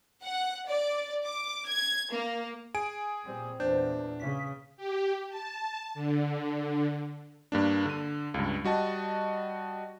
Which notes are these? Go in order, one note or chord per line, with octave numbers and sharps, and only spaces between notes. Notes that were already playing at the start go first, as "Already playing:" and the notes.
F#5
D5
D6
G#6
A#3
G#4 G#5 D7
A#2 G3 C4
E2 A#2 D4 C5
C#3 B6
G4
A5
D3
G2 A#3 D4
D3 D#7
C#2 G2
G3 F#4 D#5 A5